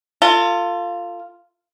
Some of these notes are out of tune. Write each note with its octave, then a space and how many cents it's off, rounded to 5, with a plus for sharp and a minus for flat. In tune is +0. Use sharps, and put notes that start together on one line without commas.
F4 -5 A4 +40